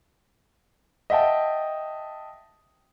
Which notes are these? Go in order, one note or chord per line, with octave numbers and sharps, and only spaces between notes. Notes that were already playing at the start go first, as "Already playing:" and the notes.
D#5 E5 F#5 G5 A5